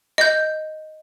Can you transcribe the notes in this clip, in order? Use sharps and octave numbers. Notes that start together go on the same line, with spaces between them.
D#5 G6